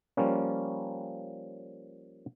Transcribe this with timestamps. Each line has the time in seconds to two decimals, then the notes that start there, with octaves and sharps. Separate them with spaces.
0.17 F3 G3 A#3 C#4